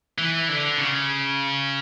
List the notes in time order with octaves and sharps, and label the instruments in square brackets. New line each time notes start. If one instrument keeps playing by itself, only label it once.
[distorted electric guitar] E3
D3
C#3